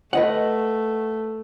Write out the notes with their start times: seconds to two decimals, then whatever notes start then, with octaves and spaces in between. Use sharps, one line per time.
0.13 A3 B4 D#5 F#5